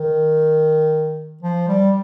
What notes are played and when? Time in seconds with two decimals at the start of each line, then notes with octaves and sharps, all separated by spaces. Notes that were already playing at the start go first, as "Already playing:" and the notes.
Already playing: D#3
1.42 F3
1.68 G3